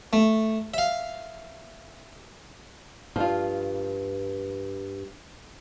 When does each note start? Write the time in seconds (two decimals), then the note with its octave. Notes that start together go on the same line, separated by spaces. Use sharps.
0.13 A3
0.74 E5 F5
3.16 G2 F3 F4